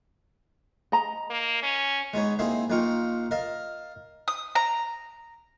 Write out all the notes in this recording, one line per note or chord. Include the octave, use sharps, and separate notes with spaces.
D#5 A#5
A#3
C#4
G#3 B3 D#4 C#5
A#3 C4 D#4 E4 G#4
A#1 A#3 D#4 F4 G5 C#6
A#4 D#5 F5 A5
D#6
A#5